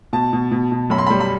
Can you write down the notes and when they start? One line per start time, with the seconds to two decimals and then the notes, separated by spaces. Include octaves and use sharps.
0.13 B2 A5
0.33 B2
0.51 B2
0.72 B2
0.90 F#2 B5
0.98 C6
1.07 G3 B5
1.20 B5